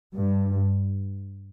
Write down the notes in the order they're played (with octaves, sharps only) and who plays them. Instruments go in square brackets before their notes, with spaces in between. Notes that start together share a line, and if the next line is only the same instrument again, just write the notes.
[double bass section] G2